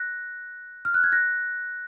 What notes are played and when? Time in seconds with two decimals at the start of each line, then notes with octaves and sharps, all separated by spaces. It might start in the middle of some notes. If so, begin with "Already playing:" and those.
Already playing: F#6 A#6
0.85 F6
0.94 F#6
1.04 G#6
1.12 F#6 A#6